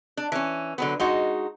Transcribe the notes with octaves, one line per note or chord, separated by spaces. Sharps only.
D4
E3 C#4
D3 F#3 B3
G#3 D#4 F#4